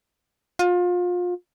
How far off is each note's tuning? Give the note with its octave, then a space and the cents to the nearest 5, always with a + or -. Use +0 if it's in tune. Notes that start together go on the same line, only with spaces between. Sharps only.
F4 +30